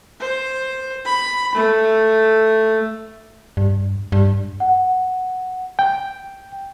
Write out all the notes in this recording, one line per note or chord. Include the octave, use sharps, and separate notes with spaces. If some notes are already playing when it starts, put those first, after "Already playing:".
C5
B5
A3
G2
G2
F#5
G5